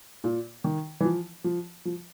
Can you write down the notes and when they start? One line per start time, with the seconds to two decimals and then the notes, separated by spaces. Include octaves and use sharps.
0.24 A#2
0.64 D#3
1.00 E3
1.05 F3
1.44 F3
1.85 F3